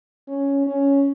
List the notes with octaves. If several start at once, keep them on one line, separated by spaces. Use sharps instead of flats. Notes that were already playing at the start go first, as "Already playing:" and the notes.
C#4
C#4